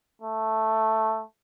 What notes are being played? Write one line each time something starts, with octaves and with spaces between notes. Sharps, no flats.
A3